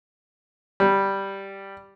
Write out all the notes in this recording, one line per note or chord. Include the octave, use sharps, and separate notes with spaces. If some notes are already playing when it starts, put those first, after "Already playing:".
G3